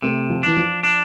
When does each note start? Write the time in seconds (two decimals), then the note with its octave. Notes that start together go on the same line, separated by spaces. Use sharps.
0.02 C3 A3
0.30 F3
0.43 E3 D4
0.57 F3
0.83 D4